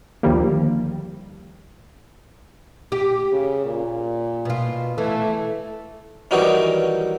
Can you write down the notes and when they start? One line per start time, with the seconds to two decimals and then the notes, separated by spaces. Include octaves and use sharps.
0.23 D2 D#3 F3 G3 A#3
2.92 G4
3.32 C#3
3.65 A#2
4.45 B2 F4
4.98 E3 A3
6.31 D#3 E3 F#3 G3 C#4 D#4